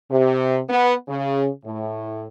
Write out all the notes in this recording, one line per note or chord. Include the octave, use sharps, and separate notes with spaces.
C3
B3
C#3
A2